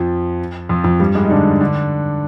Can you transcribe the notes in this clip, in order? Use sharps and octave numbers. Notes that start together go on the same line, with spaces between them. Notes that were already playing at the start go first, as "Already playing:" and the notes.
Already playing: F2 F3
F2 F3
F2 F3
G2 G3
G#2 G#3
D#4
D3 D4
D3 D4